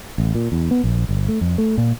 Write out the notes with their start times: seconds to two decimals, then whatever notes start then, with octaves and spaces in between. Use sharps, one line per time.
0.18 A1
0.35 A#2
0.52 E2
0.71 B3
0.84 A#1
1.09 G1
1.28 A3
1.41 F2
1.58 A3
1.78 A#2